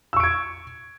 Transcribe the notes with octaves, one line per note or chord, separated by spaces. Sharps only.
C#6 E6 G#6 D7